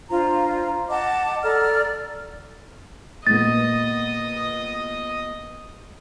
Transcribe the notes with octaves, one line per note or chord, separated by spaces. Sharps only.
D4 F4 C5 A#5
D#5 F#5 A5 D6
A4 D5 A#5 F6
A#2 A#3 B3 D#5 A6